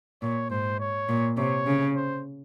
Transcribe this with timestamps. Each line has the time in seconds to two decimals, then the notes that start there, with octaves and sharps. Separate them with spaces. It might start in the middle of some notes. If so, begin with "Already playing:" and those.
0.22 A#2 C#5
0.51 G#2 C5
0.79 C#5
1.09 A#2
1.37 C3 C#5
1.66 C#3
1.96 C5